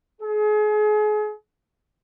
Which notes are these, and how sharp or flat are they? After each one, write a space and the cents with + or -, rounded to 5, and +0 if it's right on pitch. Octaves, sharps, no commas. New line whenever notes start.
G#4 +35